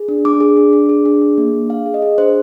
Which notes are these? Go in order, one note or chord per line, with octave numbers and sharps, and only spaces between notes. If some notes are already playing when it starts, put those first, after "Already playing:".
Already playing: G#4
D4
D4 D6
G#4
D4
D4
G#4
D4
G#4
A#3
D4
G#4 F5
G#4
D#5
G#4
D4 C5